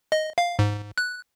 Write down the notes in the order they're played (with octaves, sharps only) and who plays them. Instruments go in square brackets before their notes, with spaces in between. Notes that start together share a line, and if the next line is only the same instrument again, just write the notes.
[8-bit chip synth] D#5
F5
G#2
F#6